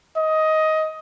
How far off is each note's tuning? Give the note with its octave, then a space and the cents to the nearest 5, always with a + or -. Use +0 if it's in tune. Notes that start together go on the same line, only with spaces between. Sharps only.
D#5 +15